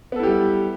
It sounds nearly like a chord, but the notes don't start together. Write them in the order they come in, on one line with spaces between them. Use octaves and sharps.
B3 A4 E4 G4 G3